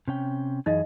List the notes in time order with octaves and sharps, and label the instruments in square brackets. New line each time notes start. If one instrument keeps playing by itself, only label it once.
[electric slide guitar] C3 C#4 G5
[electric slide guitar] F#2 E3 G#4 [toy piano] D#4 D#5 F5